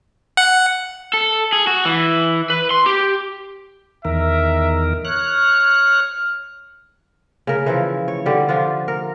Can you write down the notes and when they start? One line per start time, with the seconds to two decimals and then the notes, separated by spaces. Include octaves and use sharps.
0.37 F#5
1.14 A4
1.53 G#4
1.67 F#4
1.85 E3
2.50 B4
2.71 C6
2.86 G4
4.05 E2 D#3 A#4 E5
5.05 C#5 F6 F#6
7.47 C#3 A#4
7.66 E3 F3 E4
8.08 C#5
8.26 D3 G3 G4
8.48 F3 D4 F4
8.88 A#4